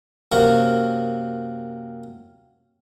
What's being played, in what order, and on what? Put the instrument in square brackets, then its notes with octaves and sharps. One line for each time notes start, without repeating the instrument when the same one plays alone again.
[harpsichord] F#2 C3 A#3 A#4 C#6